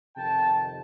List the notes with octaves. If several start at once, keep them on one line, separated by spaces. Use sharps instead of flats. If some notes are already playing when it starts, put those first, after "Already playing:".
F2 C3 D#3 G5 A5